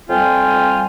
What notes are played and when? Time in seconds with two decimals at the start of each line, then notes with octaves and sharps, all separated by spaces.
0.10 F2 G3 C4 F4 G5 G#5